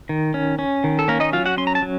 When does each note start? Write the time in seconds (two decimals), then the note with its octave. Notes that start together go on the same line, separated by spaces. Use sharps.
0.09 D#3
0.34 C#4
0.59 C#4
0.84 D#3
0.99 A4
1.08 A#3 C#4 A#4
1.20 D#4 D#5
1.33 F#3 F4 F5
1.46 F#4 F#5
1.57 C#4 C6
1.67 A#5
1.75 A5
1.82 F#3